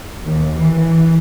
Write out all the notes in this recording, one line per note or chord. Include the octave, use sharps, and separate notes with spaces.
D#2
E3